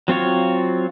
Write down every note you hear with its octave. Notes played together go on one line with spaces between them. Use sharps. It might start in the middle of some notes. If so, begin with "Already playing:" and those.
F#3 C4 F4 C#5